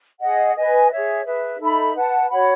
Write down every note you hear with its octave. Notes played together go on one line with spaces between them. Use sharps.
G#4 D#5 F#5
B4 D#5 G#5
G#4 C#5 E5
G#4 B4 E5
D#4 A4 E5 B5
B4 F#5 A5
F#4 C#5 F#5 B5